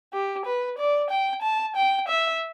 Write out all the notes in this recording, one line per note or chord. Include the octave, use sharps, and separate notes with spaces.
G4
B4
D5
G5
A5
G5
E5